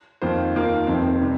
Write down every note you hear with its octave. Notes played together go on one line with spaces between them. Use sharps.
F2 D#3 A#3 F4 C5
D#2 D#3 A#3 F4 A#4
F1 F2 C3 D#3 C4
C3 G3